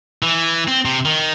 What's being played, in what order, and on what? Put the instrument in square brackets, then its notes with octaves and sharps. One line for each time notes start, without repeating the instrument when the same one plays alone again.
[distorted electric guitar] E3
C4
C3
D#3